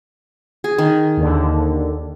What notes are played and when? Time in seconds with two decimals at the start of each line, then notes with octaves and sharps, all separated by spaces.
0.64 G#4
0.78 D#3
1.17 D#2 D3